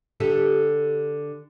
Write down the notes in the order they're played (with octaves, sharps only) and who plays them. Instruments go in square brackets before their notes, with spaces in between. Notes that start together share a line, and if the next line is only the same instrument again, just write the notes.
[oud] D3 G4 A4